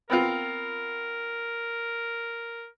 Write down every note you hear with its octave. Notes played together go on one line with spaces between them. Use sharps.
B3 C4 F4 A#4